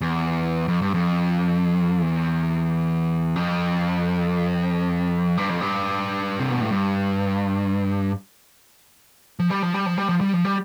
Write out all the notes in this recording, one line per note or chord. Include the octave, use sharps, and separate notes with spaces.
E2
F2
G2
F2
E2
F2
G2
F2
G2
C3
B2
A2
G2
F3
G3
F3
G3
F3
G3
F3
G3
F3
G3